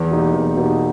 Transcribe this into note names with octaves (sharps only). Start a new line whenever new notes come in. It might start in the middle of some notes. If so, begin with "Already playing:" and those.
Already playing: E2
B2 A#3 D#4 G4
E2
B2 A#3 D#4 G4